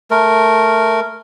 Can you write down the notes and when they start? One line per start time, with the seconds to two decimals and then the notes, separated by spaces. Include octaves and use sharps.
0.11 A3 A#4